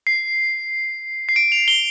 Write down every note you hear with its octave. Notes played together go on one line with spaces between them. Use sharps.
C7
C7
D7
F7
G7